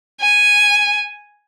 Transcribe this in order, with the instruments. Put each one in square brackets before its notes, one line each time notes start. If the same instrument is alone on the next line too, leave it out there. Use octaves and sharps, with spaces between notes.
[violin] G#5